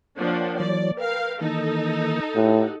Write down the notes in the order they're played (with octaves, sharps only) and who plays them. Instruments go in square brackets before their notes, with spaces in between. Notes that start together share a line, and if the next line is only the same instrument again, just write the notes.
[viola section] F3 A#3 D4 [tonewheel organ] C#5 F#5 G5
[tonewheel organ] E3 F#3 C#5 [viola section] D5
[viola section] A#4 F5 [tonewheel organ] B4 G5
[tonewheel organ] D#3 E3 A#3 [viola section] D#4 A4
[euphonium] A2 [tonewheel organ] G4 F#5